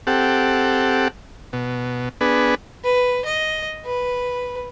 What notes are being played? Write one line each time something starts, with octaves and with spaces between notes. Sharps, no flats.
C4 G4 A4 F#5
B2
B3 D4 G#4 B4
B4
D#5
B4